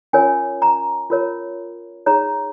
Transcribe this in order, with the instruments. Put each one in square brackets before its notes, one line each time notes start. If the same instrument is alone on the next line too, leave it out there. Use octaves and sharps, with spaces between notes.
[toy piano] C#4 F4 A#4 C#5 G#5
A#5
F4 A#4 C#5
D#4 G#4 C#5 A#5